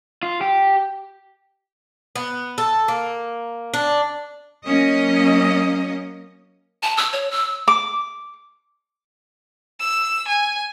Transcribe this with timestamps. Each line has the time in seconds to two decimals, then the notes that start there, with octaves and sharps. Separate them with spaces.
0.23 F4
0.41 G4
2.15 B3
2.58 A4
2.88 A#3
3.74 D4
4.66 F#3 A#3 C#4 D#5
6.83 A5
6.97 E6
7.13 C#5
7.31 E6
7.68 D6
9.80 E6
10.27 G#5